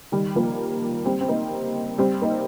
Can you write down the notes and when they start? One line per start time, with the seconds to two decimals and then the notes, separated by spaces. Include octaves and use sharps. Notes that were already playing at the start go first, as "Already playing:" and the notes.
0.12 D#3 G3
0.35 F3 A#3
1.05 G3 C4
1.21 C4
1.28 A#3 D#4
1.98 G3 C4
2.22 A#3 D#4